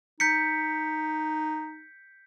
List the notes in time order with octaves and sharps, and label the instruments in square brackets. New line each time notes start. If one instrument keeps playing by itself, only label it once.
[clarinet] D#4 [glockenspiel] G6 B6 C#7